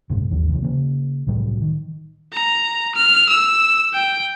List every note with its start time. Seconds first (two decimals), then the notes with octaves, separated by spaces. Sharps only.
0.10 F#1 C2 G#2
0.30 G#1 D#2 E3 F#3
0.49 C2 E3
0.63 C#3 A#3
1.27 C2 A2 F#3 G3
1.61 D#3
2.33 A#5
2.95 F6
3.29 E6
3.94 G5